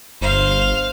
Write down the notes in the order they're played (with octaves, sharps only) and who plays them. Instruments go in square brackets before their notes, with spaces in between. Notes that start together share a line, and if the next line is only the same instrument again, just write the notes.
[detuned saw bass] G1 [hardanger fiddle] C5 F5